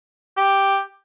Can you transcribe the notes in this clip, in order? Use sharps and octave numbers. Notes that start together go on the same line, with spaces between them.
G4